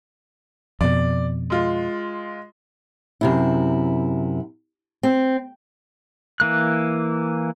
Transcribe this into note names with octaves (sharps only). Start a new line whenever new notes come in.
F2 B2 D5
G#3 F4
F#2 C3 E4
C4
E3 A#3 F#6